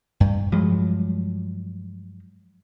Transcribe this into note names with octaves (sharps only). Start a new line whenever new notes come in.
G2
G2 F3 F#3 G#3